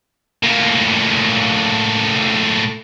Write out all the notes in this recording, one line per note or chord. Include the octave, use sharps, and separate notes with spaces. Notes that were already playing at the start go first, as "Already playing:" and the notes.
A2 A#3